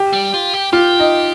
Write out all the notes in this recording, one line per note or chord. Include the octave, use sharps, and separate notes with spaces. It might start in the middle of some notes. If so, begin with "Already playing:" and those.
Already playing: G4
G3
F4
G4
F4 G4
D#4